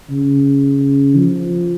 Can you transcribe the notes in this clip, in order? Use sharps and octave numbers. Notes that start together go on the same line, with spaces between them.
C#3
F3